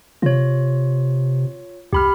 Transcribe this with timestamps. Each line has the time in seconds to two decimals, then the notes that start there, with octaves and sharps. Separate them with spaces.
0.22 C3 F4 C#5
1.93 C2 G4 B5 F6